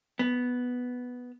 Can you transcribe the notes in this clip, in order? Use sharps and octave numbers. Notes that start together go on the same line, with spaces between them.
B3